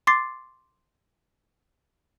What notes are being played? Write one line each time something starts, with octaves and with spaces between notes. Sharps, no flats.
C6 D6 A6 C7